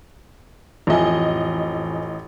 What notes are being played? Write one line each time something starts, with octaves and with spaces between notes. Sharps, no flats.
A1 F2 D#5 E5 G#5